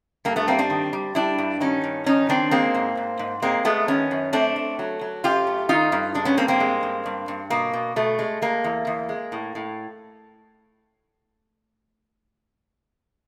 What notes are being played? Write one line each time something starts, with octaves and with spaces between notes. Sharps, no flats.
G2 A#3
A3 B3
G3 A#3 C4
C4 D4
D#3
G3
G3 D4 E4
G2
D#3 C#4 D#4
G2
D#3 C#4 D#4
D#3 C4 D4
G#3 A#3 C4
G#2
G#2
G#2
G#3 A#3 C4
G#3 A3 B3
D#3 B3 C#4
F#2
A3 C4 D4
A3
F#3
F#3
F#2 F4 G4
A3
D#3 D#4 F4
G2
G#3 D4
B3 C#4
G2 A#3 C4
A#3 C4
G#3
G2
G2
G2
B2 A#3
B2
B2 A3
G#3
G#3 A#3
E2
E2
G#3
A2
A2